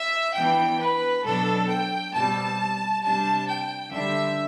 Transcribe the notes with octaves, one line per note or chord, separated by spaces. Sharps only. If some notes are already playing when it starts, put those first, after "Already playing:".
Already playing: E5
E3 B3 D4 G5
B4
B2 F#3 B3 D4 A4
G5
B2 G3 C4 A5
C3 G3 D4 A5
G5
D3 G3 D4 E5